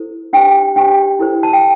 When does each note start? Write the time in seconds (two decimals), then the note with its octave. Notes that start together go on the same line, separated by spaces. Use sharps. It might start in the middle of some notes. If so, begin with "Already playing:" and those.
Already playing: E4 A4 C5
0.33 D4 G4 C5 G5
0.76 D4 G4 C5 G5
1.19 E4 A4 C5
1.43 A5
1.53 G5